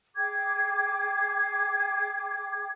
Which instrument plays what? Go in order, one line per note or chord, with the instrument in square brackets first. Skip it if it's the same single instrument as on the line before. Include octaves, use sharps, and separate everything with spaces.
[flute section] G#4 G5 D6 G#6